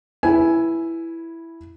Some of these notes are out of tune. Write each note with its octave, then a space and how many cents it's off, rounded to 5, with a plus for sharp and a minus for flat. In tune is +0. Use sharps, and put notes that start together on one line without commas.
E4 +5 B4 -10 G#5 +10